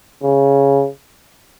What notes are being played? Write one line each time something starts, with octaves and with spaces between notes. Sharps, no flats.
C#3